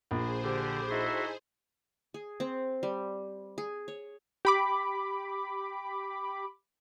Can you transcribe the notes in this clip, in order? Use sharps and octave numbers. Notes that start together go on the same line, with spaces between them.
A#1 G#4 C5
D3 G4
D#4 E4 F#4 A4 E5 C6
G#4
C4
G3
G#4
C#5
G4 B5 D6